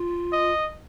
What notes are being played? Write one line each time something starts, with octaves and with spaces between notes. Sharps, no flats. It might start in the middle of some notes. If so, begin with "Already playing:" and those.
Already playing: F4
D#5